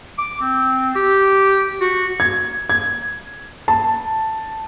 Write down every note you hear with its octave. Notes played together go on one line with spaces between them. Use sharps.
D6
C4
G4
F#4
G#6
G#6
A5